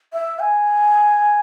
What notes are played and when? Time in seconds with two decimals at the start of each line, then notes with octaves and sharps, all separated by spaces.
0.13 E5
0.39 G#5